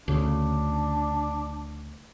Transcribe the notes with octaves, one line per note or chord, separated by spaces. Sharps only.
D2 C#3 D4